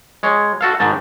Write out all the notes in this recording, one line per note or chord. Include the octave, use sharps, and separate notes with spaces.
G#3 C#5
F#4 A4 F5
G#2 D#3 A5